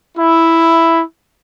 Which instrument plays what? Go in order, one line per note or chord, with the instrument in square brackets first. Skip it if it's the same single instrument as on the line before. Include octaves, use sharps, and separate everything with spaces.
[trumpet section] E4